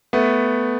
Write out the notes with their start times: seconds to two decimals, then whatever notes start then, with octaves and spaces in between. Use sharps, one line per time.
0.13 A3 B3